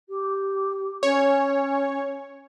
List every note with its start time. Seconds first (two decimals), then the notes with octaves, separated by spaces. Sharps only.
0.09 G4
1.03 C#4 C#5